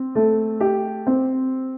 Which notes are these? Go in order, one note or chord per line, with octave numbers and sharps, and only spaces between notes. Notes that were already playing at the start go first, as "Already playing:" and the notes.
Already playing: C4
A3
G4
C4